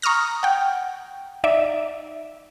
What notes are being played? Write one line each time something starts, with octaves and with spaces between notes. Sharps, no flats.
A#5 C#6 D#6 F6 A#6
F#5 G5
D#4 D5 E5